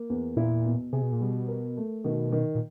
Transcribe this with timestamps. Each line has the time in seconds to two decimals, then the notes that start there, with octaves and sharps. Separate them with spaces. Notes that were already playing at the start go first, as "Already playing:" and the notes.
Already playing: A#3
0.10 E2
0.36 A#2 E4
0.65 B2
0.93 C3 G#4
1.02 B2
1.12 A#2
1.20 B2 G3
1.48 A#4
1.77 A3
2.04 B2 D#3
2.32 D#3
2.55 A#2